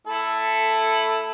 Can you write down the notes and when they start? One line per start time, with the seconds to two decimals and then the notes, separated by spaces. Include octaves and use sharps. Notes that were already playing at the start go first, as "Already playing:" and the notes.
0.07 A3 E4 A4